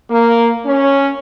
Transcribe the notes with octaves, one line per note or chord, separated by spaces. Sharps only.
A#3
C#4